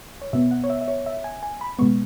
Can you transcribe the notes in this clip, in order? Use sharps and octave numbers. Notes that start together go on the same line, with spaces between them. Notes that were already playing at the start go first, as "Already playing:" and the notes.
C#5
B2 B3 E5
F#5
C#5
E5
E5
C#5
E5
G#5
G#5
B5
B2 G#3 B3 C#6